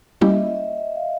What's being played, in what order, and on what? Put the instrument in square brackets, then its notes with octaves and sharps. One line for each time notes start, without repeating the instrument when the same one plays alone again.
[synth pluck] G3 A#3 C#4 E4 G4 [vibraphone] D#5
[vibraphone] E5
D#5
E5
D#5
E5
F5